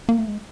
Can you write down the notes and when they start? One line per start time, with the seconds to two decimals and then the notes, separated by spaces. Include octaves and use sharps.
0.09 A#3
0.19 A3
0.28 G#3